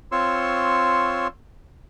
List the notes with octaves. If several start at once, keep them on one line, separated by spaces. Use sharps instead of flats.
C4 F4 C#5 C6 C#6 E6